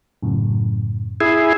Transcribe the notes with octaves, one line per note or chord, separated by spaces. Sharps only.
F#2 A2 C#3
E4 G#4